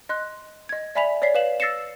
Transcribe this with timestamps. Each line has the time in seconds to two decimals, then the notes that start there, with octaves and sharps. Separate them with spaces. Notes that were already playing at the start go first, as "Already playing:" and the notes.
0.09 D#5 C6 F#6
0.69 D#5 G#6
0.95 D5 E5 G#5 B5 B6 F7
1.22 C#5 D5 B6 C7
1.34 B4 F5 E7 F#7
1.60 E6 A6 A#6 C7 C#7 E7